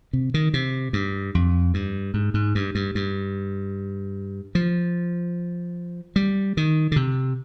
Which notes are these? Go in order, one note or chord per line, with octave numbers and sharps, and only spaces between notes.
C3
D#3
C3
G2
F2
G2
G#2
G#2
G2
G2
G2
F3
G3
D#3
D3
C3